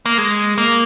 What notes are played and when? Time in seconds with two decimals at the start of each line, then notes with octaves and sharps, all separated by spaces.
0.06 A#3
0.18 G#3
0.58 A#3